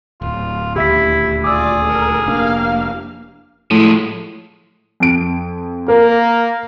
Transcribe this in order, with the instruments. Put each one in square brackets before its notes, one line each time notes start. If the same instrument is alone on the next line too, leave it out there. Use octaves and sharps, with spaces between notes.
[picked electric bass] D1 [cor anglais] F4
[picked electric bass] D#1 D2 [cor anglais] E4 [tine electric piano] G4 E5 B6
[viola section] F4 D5 [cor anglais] G#4 [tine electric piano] D6 E6
[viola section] A4 A#4
[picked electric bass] F1 D4 [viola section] A#3 G4 F5
[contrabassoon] A2 [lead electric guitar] F3 G#3
[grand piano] F2 D7
[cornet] A#3 [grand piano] A#4